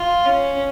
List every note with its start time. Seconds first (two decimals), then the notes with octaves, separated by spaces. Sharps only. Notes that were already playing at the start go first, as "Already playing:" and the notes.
Already playing: F4
0.25 C#4